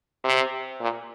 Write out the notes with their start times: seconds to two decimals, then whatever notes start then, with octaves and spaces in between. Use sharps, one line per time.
0.24 C3
0.81 A#2